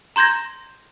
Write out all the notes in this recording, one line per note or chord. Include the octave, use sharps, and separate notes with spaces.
A#5 C6 G6 G#6 A#6